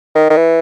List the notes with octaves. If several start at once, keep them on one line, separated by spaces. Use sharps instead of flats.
D#3
D#3
E3